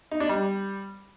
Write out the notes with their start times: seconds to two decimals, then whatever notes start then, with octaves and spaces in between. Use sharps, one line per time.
0.11 D#4
0.20 D4
0.29 G3